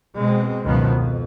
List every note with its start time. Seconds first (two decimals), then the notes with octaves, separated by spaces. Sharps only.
0.14 B2 G#3 C4
0.64 C#2 F#2 B2 D#3 F3 B3
0.95 F2